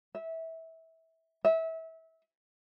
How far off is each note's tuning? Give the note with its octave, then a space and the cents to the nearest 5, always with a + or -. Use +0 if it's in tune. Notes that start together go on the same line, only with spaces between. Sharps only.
E5 -20
E5 -25